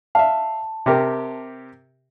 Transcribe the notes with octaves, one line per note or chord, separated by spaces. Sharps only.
E5 F5 A5
C3 G4 A#4